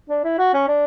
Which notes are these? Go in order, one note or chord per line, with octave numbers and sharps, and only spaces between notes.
D4
E4
F#4
C#4
D4